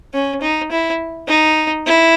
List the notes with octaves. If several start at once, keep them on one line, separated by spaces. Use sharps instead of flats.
C#4
D#4
E4
D#4
E4